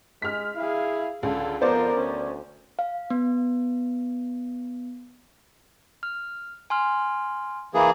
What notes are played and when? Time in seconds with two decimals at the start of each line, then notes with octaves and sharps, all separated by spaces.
0.22 G#3 F6 B6
0.56 E4 G#4 F5
1.23 C#2 D3 F4 A4
1.61 F2 B3 F4 A#4 C5 D5
1.94 D2 C#4
2.79 F5
3.10 B3
6.03 F6
6.70 G#5 C6 F6
7.74 E3 A#3 G#4